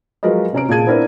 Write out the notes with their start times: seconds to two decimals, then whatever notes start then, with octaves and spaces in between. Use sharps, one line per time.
0.23 F3 F#3 G#3 A#4 B4 D#5
0.53 C3 C#4 A#5 D7
0.69 A#2 G#4 A5 G#6 D#7
0.86 B3 C4 D4 E4 A#4 B4